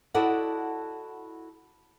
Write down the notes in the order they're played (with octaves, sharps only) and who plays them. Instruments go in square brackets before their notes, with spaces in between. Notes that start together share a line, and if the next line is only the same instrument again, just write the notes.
[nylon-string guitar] E4 F#4 A4 D5 D#5 F#5